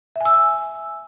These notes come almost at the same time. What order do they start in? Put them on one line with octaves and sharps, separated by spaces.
E5 G#5 E6